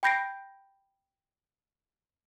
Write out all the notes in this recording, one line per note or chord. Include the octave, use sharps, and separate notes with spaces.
G5 B5 G6 A#6 C7 D7